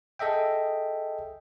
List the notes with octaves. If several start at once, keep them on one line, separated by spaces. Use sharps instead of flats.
G#4 A4 D#5 E5 G5